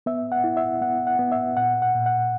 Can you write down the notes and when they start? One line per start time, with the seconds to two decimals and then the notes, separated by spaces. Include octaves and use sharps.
0.06 B3 E5
0.32 F#5
0.44 E4
0.57 E5
0.81 B3 F#5
1.07 F#5
1.19 B3
1.32 E5
1.57 A#2 F#5
1.82 F#5
1.95 A#2
2.06 F#5